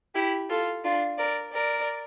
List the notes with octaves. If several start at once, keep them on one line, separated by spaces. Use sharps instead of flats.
E4 G4
F4 A4
D4 F4
A#4 D5
A#4 D5